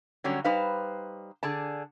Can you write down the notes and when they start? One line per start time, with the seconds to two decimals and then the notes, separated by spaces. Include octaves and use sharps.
0.24 D3 F#3 G3 C#4
0.44 G3 D#4 B4 C5 F5
1.43 D3 G#4 D5 A5